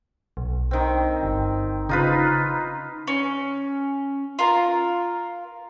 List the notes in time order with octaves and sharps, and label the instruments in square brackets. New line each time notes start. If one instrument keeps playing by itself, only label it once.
[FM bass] B1
[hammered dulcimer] D#3 C4
[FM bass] G1
[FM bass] C#3 [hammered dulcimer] D#4 F4 B4
[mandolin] C#4
F4 A#4